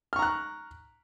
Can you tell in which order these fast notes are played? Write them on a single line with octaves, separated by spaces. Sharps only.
F6 C#6 A#5 F#6